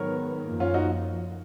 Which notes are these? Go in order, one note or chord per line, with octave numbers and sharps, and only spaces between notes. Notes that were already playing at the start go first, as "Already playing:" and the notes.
Already playing: G#2 D#3 F#3 B3 A#4 C#5
F#2 F3 A#3
C#4 F4
D#4 F#4